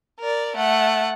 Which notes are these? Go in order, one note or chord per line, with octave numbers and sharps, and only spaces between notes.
A#4 D5
A3 F#5